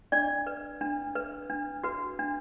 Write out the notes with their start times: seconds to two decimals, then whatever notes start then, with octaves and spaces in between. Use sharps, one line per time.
0.12 D4 D5
0.47 B4
0.81 D4
1.15 B4
1.50 D4
1.84 F#4 B4
2.19 D4